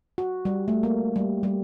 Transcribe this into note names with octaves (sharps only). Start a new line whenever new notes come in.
F#4
G3
A3
A#3
G3
G3